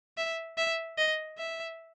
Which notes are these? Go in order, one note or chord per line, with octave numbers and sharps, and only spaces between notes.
E5
E5
D#5
E5